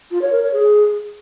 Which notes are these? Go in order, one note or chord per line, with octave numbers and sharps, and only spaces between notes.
F4
C#5
A#4
C#5
G#4